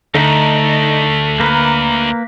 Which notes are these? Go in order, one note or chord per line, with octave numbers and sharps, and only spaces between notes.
D2 D3 A3 D#4
A#3 A#4 B4